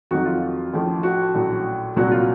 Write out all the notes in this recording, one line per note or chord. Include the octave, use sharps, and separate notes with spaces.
F2 D#3 F#3 F#4
F4
A1 A2 F3
F#4
A#1 A2 F#3
C2 A#2 F#3 F#4
F4